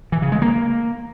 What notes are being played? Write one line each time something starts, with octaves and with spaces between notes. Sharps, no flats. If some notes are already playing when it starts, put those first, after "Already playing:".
E3
C#3
G#3
A#3